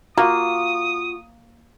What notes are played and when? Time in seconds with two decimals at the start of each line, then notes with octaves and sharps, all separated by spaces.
0.18 A#3 F4 F#4 D#6